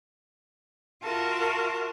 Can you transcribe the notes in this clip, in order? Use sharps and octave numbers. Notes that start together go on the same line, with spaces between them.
F4 F#4 A#4 E5 A5